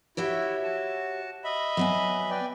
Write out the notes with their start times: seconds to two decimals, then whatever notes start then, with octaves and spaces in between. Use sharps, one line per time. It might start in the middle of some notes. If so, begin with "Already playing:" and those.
0.17 E4 F#4 G4 C#5 E5
0.64 F#4 A5
1.44 D#5 E5 B5
1.77 F#3 B3 G#5
2.30 B4 D5 G5